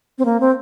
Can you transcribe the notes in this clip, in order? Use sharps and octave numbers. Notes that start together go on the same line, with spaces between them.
C4
A#3
C4